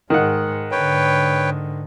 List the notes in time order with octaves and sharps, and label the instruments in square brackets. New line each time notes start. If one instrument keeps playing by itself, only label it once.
[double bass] G#2 G#3 [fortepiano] D#3 F#5
[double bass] G#2 D3 [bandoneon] B4 C#5 G5